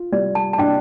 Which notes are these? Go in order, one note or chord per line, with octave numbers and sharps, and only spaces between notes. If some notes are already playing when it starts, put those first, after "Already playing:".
Already playing: F4
G3 D5
A5
A5
D4 G5